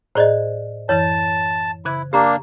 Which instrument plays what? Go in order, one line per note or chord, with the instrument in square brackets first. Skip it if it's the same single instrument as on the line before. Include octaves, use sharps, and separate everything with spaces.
[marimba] A2 G#4 [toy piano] C5 D5 D#5
[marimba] F#2 E3 A6 [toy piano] C#5 [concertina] A5
[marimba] C#3 F#6 G#6 [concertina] E4
[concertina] A#3 D4 [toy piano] G4 A#5